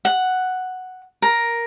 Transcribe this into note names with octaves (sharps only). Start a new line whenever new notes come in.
F#5
A#4